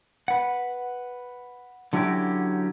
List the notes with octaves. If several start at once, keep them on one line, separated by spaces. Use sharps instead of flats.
B4 F#5
D3 F#3 C#4 E4 F#4 G4